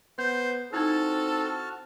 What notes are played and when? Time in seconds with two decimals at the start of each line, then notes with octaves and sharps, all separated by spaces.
0.19 B3 C5 G6
0.73 C4 D#4 E4 F#4 A4 A5 F6